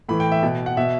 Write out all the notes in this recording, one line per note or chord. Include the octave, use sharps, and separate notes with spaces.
A2 E3 B5
G5
E5
B2
F#5
B2 E5